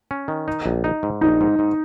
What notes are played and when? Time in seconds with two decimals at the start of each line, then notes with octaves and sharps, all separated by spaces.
0.11 C#4
0.28 D#3
0.48 D#4
0.66 A#1
0.84 D#4
1.03 G#2
1.21 A#1 D#4
1.41 G#2
1.59 G#2